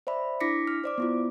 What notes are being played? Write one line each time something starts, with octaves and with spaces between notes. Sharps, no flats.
C5 D5 E5 B5
D4 E4 D6 A#6 B6 C#7
F6
C5 D5 D6
B3 E4 F4